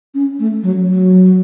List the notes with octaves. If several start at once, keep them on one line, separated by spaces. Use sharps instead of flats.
C#4
A3
F#3
F#3